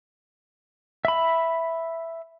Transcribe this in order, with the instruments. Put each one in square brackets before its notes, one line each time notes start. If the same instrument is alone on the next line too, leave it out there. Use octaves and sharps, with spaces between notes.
[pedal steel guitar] E5 B5